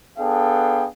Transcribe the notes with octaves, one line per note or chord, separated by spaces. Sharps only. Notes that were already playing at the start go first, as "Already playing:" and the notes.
B3 D4 G#4 A4 F5 G5